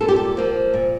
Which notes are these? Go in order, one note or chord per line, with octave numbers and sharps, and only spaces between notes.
A#2 A4
G4
A4
F3 A#3
A#2